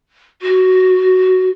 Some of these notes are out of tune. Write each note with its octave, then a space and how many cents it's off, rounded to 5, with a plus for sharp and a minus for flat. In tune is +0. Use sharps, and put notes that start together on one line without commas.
F#4 +5